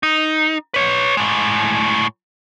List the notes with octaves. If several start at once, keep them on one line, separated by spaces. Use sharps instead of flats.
D#4
B4 C#5
A2 G#3